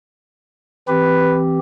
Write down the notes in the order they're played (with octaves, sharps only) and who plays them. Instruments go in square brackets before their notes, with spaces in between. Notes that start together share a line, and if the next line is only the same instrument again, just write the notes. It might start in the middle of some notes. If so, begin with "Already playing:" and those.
[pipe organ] E3 C4 G4 [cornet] B4